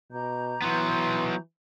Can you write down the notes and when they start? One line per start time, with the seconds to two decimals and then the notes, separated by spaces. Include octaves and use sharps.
0.11 B2 A#5 D6 G6
0.62 E3 F#3 B3 C6